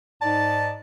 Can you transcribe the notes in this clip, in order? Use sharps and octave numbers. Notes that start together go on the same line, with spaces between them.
G#2 D#4 D5 A5